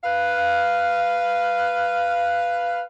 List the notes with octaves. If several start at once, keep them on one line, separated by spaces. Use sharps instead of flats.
B4 F5